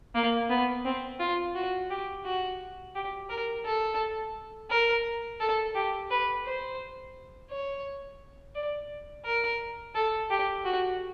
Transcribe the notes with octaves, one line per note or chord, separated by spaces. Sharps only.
A#3
B3
C4
F4
F#4
G4
F#4
G4
A#4
A4
A#4
A4
G4
B4
C5
C#5
D5
A#4
A4
G4
F#4